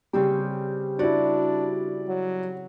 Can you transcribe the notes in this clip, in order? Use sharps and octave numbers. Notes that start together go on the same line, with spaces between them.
C#3 G3 C4 G4
D4 E4 F#4 D5
F#3